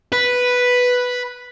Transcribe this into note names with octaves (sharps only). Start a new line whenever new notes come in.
B4